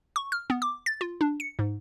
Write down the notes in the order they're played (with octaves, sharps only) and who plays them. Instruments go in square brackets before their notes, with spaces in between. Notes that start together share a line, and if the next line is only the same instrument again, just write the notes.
[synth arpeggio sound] C#6
F6
B3
D6
A6
F4
D4
C#7
G#2